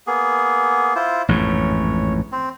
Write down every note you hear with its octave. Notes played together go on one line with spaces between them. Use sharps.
A#3 B3 G#4
E4 F4 C5
A1 F2 G#2 C#5
C4